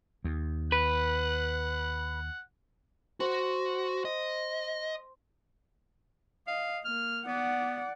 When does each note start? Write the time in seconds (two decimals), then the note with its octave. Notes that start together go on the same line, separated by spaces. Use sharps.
0.24 D#2
0.72 B4 F#5
3.20 F#4 C5
4.05 D#5
6.47 D#5 F5
6.85 A#3 F6
7.26 B3 D5 F#5